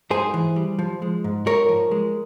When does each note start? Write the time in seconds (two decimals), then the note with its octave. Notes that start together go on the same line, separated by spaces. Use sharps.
0.11 G#2 G#4 C5
0.34 E3
0.56 G3
0.79 F3
1.02 G#3
1.24 G#2
1.47 G#2 A#4 C#5
1.69 F3
1.91 G#3